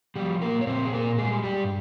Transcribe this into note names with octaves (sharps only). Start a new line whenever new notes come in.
F3 G3 G4
A#2 A#3 A#4
C#5
A#2 C4 C5
G#4
A#2 A#3 A#4
G3 G#3 G#4
G2 G3 G4